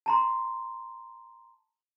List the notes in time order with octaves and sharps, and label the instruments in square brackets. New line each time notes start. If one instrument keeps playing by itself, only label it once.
[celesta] A5 A#5 C6